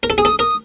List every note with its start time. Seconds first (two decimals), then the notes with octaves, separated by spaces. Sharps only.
0.03 A#4
0.10 A4
0.18 G#4
0.21 A4 D#6
0.39 A#4 D#6